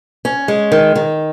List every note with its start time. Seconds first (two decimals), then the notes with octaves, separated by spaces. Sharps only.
0.25 C#4
0.48 G#3
0.72 D#3
0.95 D#3